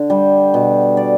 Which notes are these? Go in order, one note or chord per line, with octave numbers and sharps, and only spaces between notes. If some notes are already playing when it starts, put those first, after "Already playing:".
Already playing: D3
G3
B2
D5